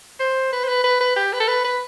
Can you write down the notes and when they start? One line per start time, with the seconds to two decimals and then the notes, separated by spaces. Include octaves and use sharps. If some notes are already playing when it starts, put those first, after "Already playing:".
0.20 C5
0.53 B4
0.64 C5
0.68 B4
0.84 B4
1.00 B4
1.16 G4
1.33 B4
1.40 A4
1.48 B4
1.64 B4